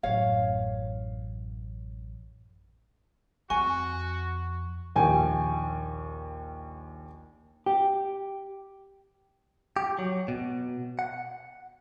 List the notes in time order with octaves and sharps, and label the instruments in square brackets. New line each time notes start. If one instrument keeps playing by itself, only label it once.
[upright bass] A1 F#2 [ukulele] C#5 F5
[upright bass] F2 [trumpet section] F#4 [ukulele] G#5 [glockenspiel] C#6
[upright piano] A#1 D#2 G5 G#5
[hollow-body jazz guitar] G4
[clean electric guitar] G4
F#3
B2
F#5